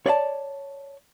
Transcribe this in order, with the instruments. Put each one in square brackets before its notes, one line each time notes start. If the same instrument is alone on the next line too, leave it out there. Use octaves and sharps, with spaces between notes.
[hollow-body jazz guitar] C#5 D5 F5 A5